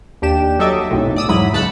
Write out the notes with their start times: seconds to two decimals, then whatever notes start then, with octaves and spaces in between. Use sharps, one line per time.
0.22 D#2 D4 G4 E7
0.59 F#3 A4 D#5 E5 D6
0.90 B1 F#2 A2 C3
1.16 D5 D#6 E6
1.28 E2 G#2 F#3 E4 B5 D#6
1.53 C#2 C#3 A5 B5 F#6 C#7